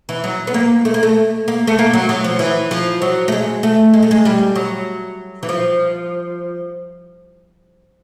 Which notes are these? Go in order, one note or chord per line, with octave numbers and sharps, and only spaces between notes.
E3
F#3
B3
A#3
A3
A#3
A3
A#3
A3
A#3
F#3
F#3
F3
E3
F3
F#3
A3
G#3
A3
G#3
A3
G#3
G3
F#3
E3
F3